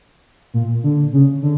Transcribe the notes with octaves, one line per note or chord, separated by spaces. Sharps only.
A#2
D3
C#3
D3